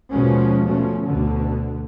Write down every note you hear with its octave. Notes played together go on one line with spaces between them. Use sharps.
D#2 B2 F3 G#3 A#3 C#4
B2 F3 A3 C#4
D2 B2 D3